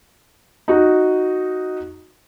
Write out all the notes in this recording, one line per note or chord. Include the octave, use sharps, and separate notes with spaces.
D#4 F#4